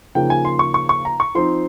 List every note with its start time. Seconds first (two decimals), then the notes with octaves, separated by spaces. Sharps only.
0.15 C#3 F3 A#3 D#4 G5
0.30 G#5
0.45 C6
0.59 C#6
0.74 C#6
0.89 C#6
1.05 A#5
1.20 C#6
1.35 F3 C4 D#4 C6